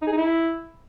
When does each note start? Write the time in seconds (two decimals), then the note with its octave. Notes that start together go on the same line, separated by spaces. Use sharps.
0.02 D#4
0.07 G#4
0.12 D#4
0.17 E4